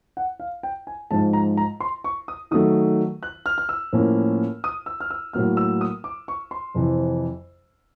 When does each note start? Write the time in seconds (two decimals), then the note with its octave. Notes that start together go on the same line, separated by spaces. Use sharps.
0.17 F#5
0.40 F5
0.63 G5
0.87 G#5
1.11 G#2 F3 G#3 A5
1.33 A#5
1.57 A#5
1.80 C6
2.04 C#6
2.28 D#6
2.51 D#3 F#3 A3 D#6
3.23 F#6
3.46 F6
3.58 F6
3.69 E6
3.93 A2 F3 A#3 C#4
4.64 D#6
4.86 E6
5.00 F6
5.11 E6
5.33 A2 F#3 A#3 F6
5.57 E6
5.81 D#6
6.04 D6
6.28 C#6
6.51 C6
6.75 F2 C3 E3